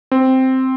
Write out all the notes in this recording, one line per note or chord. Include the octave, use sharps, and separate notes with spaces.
C4